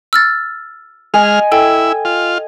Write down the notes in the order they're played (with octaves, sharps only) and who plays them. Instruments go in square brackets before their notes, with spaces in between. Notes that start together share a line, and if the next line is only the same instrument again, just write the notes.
[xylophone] E6 F6 A6
[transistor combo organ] G#3 F6 [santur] D#5 G#5
[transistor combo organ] E4 [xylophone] A4 G5
[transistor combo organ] F4